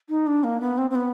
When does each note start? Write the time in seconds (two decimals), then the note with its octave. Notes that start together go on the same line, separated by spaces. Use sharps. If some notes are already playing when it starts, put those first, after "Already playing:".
0.09 D#4
0.26 D4
0.43 A#3
0.60 B3
0.77 C4
0.90 C4
0.95 B3